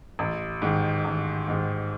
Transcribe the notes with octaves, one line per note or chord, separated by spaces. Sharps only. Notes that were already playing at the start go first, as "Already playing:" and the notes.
A1
G#2 D#3
A1
G#2 D#3